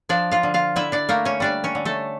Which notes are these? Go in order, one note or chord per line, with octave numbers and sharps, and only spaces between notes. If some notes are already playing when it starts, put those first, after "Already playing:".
F3 D4 D5
F4 F5
D3
F4 F5
D3 E4 E5
D4 D5
A3 A#3 A#4
C#4 C#5
G3 D4 D5
C#4 C#5
D3
A3 A4